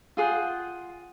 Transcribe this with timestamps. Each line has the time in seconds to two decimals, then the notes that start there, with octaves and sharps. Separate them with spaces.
0.17 F4 G#4 F#5 G5